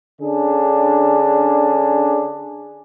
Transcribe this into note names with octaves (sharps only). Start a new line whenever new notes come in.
D3 C#4 D4 G#4